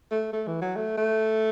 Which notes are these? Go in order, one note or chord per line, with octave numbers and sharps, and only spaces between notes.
A3
A3
E3
F#3
A3
A3